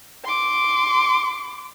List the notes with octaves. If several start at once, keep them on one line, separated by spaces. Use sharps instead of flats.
C6 D6